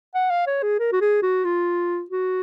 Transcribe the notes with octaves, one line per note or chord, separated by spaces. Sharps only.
F#5
F5
C#5
G#4
A#4
F#4
G#4
F#4
F4
F#4